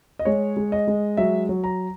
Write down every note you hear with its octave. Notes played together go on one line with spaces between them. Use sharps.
D#5
G#3 C#5
G#3
D#5
G#3
F#3 E5
F#3
A#5